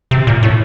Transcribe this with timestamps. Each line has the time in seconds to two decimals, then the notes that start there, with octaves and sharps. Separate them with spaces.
0.11 C3
0.27 A#2
0.43 A2